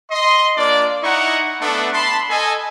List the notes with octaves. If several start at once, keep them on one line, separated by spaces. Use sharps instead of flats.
D#5 C6
A#3 D4 F4 D5
D#4 E4 D#5 F#5 A#5 C#6
A3 B3 D4
A5 B5 C6
A4 D#5 G#5